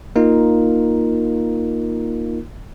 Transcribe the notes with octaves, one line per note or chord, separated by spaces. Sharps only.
A#3 D#4 F4 A#4